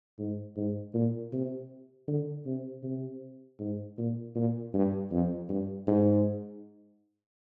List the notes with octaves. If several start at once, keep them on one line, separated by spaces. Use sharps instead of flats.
G#2
G#2
A#2
C3
D3
C3
C3
G#2
A#2
A#2
G2
F2
G2
G#2